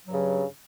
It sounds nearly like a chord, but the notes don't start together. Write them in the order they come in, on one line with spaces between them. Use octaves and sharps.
F#3 G2 C#3